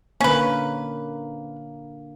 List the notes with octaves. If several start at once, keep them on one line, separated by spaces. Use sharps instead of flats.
D3 A#3 C#4 B4